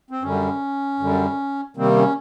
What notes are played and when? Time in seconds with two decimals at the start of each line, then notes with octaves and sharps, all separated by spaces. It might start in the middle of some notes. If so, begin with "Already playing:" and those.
0.10 C4
0.22 F#2 D3 G3 C#4
1.00 F#2 D3 G3
1.77 C3 D#3 G3 A#3 C4
1.91 C4
1.96 C#4